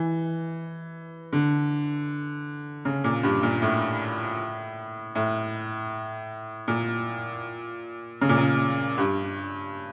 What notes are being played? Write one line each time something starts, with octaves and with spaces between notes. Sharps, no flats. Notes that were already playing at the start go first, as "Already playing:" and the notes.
Already playing: E3
D3
C#3
A#2
G2
A#2
A2
A2
A#2
C#3
A#2
C#3
G2